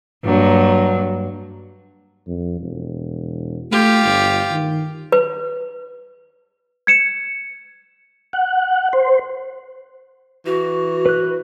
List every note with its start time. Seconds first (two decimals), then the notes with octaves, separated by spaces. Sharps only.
0.24 G2 F#3 A#3
2.27 F2
2.60 E1
3.71 A3 F4 G4
4.05 G1
4.51 D#3
5.12 B4
6.87 G#6 C#7 E7
8.33 F#5
8.93 C5
10.46 E3 F#4
11.06 B4 F#6